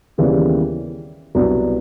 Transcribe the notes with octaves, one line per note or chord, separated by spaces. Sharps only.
D#2 C#3 E3 G3 B3
C2 B2 F#3 B3 D4